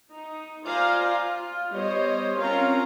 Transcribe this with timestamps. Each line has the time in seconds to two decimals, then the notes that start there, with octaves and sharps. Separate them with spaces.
0.12 D#4
0.67 F4 C5 D5 F5 G#5 A#5
1.10 F4
1.73 G3 B3 C5 C#5 D#5
2.38 C4 C#4 F4 A#4 F5 A#5